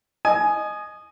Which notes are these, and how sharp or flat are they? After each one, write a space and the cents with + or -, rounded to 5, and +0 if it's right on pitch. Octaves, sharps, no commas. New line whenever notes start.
D#5 -15 G#5 +15